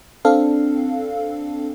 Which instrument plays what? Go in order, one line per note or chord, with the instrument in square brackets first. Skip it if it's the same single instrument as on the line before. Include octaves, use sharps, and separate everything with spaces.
[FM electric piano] C4 D4 A4 F5